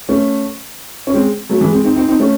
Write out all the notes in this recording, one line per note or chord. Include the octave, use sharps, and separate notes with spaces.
A3 C#4
C#4
G#3 C4
F#3 A3
E3 G#3
G#3 C4
C4 D#4
C4 D#4
C4 D#4
A3 C#4